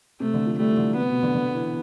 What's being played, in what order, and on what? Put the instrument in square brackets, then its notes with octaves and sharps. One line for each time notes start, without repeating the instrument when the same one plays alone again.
[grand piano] C3 [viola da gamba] A3
[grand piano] D3
F3
[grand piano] G3 [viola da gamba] A3
[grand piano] E3
D3
[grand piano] C3 [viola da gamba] B3
[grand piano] B2
D3
D3
E3